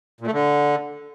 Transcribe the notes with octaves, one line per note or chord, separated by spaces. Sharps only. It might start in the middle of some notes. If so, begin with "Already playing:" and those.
A#2
A3
D3